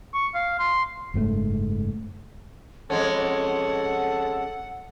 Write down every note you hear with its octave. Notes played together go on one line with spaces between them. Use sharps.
C#6
F5
C6
F#1 G#2 C#3 A3
F2 G#3 C#4 A4 F#5